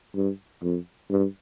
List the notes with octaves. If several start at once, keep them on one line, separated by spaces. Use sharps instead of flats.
G2
F2
G2